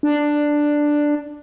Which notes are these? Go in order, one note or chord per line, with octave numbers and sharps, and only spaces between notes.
D4